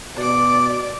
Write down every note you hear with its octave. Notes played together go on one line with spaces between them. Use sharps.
B2 D5 D6